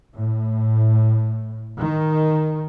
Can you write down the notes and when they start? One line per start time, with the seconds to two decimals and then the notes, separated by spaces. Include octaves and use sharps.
0.15 A2
1.79 D#3